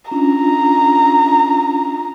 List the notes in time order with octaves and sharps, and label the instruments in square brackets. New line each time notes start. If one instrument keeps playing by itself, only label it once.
[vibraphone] C#4 D4 F4 [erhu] A#5